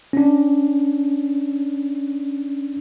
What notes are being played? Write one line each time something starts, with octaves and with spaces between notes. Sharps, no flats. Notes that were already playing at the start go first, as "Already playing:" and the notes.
C#4 D4